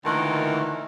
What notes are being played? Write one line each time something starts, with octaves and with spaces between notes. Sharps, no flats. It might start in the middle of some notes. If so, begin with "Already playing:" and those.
D2 A#2 D#3 E3